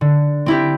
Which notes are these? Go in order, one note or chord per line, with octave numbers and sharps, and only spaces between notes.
D3
C4 E4 G4